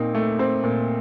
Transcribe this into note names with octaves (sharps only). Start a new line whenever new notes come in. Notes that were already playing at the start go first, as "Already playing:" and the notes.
Already playing: A#2 C4 D#4
A3
C4
A#2